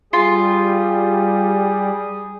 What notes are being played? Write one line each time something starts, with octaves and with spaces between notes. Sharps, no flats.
G3 F4 G#4